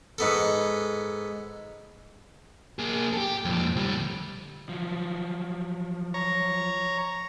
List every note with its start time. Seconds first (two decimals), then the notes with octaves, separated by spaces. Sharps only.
0.18 G#2 B3 A4
2.79 A#3 G#4
3.13 G4 A4
3.45 F2 A#2
3.76 D2 G3
4.69 F3 F#3
6.14 C#5 A#5